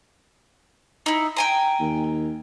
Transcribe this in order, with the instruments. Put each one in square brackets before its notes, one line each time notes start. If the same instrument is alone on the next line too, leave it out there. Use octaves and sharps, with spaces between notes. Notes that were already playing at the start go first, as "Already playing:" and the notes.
[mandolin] D#4 E4
G5 G#5 A#5
[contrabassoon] D#2